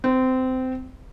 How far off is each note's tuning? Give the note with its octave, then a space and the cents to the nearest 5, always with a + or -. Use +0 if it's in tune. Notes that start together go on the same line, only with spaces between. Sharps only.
C4 -20